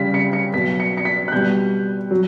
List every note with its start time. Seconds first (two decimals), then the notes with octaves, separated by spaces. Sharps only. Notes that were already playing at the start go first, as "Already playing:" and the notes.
Already playing: C#3 G3 B6
0.14 C#7
0.33 C#7
0.54 B2 F#3 B6
0.80 C#7
0.97 C#7
1.05 B6
1.28 F#6
1.32 B2 G3 G6
2.11 F#3